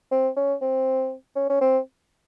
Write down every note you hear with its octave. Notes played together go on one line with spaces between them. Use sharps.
C4
C#4
C4
C#4
C#4
C4